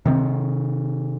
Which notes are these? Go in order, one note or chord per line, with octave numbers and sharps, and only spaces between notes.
C3 D#3 C4